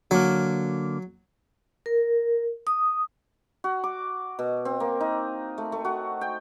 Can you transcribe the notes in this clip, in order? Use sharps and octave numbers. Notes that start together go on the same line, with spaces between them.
D3 F#3 A#3
A#4
D#6
F#4
D6
B2
C4
A#3
D#4
A3
A3
F#4
G5